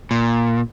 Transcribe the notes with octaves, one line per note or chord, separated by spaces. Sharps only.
A#2